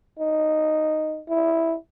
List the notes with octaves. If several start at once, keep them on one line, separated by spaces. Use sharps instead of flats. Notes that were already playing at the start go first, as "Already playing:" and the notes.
D#4
E4